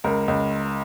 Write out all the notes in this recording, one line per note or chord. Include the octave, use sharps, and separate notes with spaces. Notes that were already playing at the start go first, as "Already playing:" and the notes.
C#2 A#4
C#2